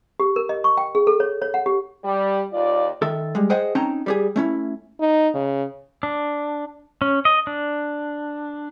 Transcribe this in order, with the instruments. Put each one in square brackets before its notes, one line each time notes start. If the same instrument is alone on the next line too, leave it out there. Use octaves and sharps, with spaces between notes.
[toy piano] G4
A#4
D#5
C#6
G5
G#4
A4
C#5
C#5
F#5
G4
[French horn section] G3
D#2 F4 D5
[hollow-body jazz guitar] D#3 A4 E5
G3 G#3
G#4 C5 D#5 F#5 G5
C4 C#4 D#4 G5 A5 A#5
G3 G4 G#4
A3 C#4 E4
[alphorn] D#4
C#3
[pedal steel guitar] D4
C#4
D#5
D4